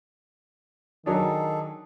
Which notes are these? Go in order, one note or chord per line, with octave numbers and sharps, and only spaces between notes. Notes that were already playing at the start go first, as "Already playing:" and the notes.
D#3 F#3 D4 G#4 A4